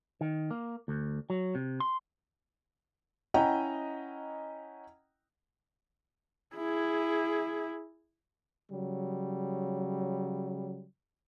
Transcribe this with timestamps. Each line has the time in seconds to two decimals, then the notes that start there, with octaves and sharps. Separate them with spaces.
0.21 D#3
0.51 A#3
0.88 D2
1.30 F#3
1.55 C3
1.80 C6
3.34 C#4 E4 D#5 F#5 G5 A#5
6.56 E4 G#4
8.70 C#3 F#3 G3